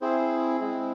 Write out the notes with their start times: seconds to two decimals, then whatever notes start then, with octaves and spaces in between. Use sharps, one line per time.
0.01 C4 E4 G#4 C5
0.60 G#3 C4 E4